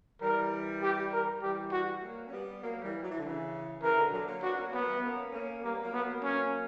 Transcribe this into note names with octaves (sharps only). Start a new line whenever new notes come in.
E3 G3 A#4
G4
A#4
E3 G3 G4
F#4
F#3 A#3
C#4
G3 B3
F#3 A#3
E3 G3
F#3
E3
D3
C#3 E3
C#3 E3 A#4
B2 D3
D3 F#3
F#3 A#3
B3 D4 F#4
A#3 C#4
F#3 A#3 B3
E3 G3
A#3 C#4
A#3 C#4
G3 A#3 B3
F#3 A#3
B3
F#3 A#3
C#4